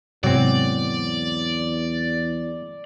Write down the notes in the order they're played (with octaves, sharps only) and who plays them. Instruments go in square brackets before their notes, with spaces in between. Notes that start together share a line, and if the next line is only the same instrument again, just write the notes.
[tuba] E2 [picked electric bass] G#2 C3 G#3 [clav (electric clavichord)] F#3 C4 [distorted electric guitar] D5